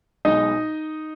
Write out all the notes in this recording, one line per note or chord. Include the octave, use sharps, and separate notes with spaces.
B1 B2 G#3 D#4 D#5